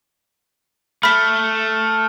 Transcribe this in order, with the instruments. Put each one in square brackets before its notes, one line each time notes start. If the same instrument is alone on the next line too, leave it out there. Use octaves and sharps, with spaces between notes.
[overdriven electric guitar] A3 [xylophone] B5 B6 [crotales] F6